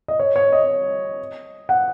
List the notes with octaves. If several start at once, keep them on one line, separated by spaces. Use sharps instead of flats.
D#5
C#5
C#5
D#5
F#5